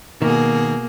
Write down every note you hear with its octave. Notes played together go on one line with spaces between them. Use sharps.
B2 D#3 A#3 G#4